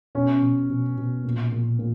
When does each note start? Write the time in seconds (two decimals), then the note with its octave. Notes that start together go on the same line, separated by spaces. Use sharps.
0.15 B2 C#4
0.42 B2
0.70 B2
0.97 B2
1.25 A#2
1.52 A#2
1.79 A#2